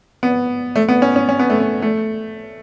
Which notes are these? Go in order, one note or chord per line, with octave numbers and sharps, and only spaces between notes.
B3
A3
B3
C#4
C#4
C#4
B3
A3
B3
A3